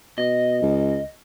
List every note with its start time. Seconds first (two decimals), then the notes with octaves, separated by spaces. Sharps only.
0.18 B2 D#5
0.62 C#2